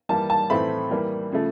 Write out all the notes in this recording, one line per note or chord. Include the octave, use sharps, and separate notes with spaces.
E3 G3 A#3 A5
A5
A2 E3 A3 C4 B5
E3 G3 A#3
C#3 F3 A3